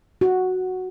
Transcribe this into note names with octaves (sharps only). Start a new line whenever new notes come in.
F#4